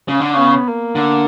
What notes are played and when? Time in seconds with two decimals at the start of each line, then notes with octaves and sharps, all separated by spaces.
0.08 C#3
0.20 D3
0.34 C#3 B3
0.67 A#3
0.95 D3